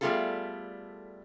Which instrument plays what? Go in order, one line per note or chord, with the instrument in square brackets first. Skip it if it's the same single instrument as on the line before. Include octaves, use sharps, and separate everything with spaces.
[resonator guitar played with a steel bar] G3 A3 B3 F4 G#4 A4